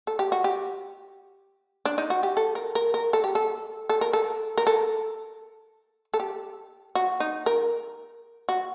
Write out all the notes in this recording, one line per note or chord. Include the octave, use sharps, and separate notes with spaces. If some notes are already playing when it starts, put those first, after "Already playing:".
A4
G4
F#4
G4
D4
D#4
F#4
G4
A4
A#4
A#4
A#4
A4
G4
A4
A4
A#4
A4
A#4
A4
A4
G4
F#4
D#4
A#4
F#4